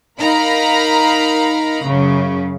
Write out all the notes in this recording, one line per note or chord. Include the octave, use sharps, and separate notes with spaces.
D#4 A#4 F5 A#5 B5
F#2 C#3